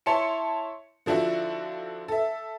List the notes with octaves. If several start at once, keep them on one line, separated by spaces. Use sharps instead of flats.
E4 C#5 A5 C6 C#7
D3 F3 D4 E4 F#4
A4 E5